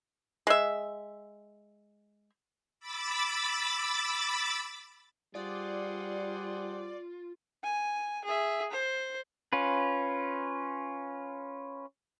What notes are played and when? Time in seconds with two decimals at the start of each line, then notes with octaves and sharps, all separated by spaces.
0.47 G#3 E5
2.80 B5 D6 E6 A6
5.35 G3 F4 G#4 C5 D5 F#5
7.64 G#5
8.25 G#4 E5
8.71 C5
9.53 C#4 F4 B4